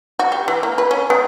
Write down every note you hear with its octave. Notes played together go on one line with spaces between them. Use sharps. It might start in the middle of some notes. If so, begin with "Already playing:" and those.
F#4
G4
E3
A#3
B4
C#4
B3